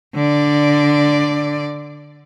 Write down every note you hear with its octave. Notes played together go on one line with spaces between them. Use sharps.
D3 D5